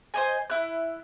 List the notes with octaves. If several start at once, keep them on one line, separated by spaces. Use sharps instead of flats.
C5 D#5 G#5
E4 F#6